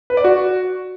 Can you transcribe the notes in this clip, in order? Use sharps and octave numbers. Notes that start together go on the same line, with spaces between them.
B4
D5
F#4